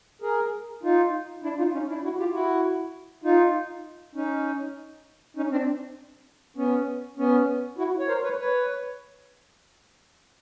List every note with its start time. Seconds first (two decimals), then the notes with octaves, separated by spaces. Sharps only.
0.22 G#4 A#4
0.83 D#4 F4
1.43 D4 E4
1.58 D#4 F4
1.73 C#4 D#4
1.88 D4 E4
2.03 E4 F#4
2.19 F4 G4
2.33 E4 F#4
3.24 D#4 F4
4.15 C#4 D#4
5.37 C#4 D#4
5.51 C4 D4
6.57 B3 C#4
7.18 B3 C#4
7.78 E4 F#4
7.99 C#5
8.08 A#4 C5
8.24 B4 C#5
8.38 B4 C#5